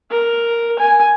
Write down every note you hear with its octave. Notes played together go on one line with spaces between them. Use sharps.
A#4
G#5